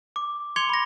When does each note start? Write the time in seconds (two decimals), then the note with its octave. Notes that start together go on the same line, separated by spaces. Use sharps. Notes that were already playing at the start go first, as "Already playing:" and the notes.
0.16 D6
0.56 C6 D6 G#6 C#7 F7 G7
0.69 B5 A#6